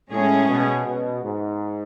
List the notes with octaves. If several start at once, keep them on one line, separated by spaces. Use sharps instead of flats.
A2 G#3 C#4 G#4
B2
B2
G#2